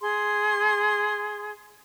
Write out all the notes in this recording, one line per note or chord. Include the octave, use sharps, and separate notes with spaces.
G#4 C6